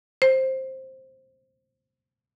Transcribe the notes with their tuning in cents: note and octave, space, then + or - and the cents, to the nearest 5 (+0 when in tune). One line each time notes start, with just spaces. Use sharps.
C5 +10